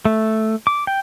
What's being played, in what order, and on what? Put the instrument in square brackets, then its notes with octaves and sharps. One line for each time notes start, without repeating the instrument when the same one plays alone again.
[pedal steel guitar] A3
D6
G5